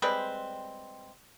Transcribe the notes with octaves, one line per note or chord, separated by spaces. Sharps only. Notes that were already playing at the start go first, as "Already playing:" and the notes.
G3 G#3 C4 B4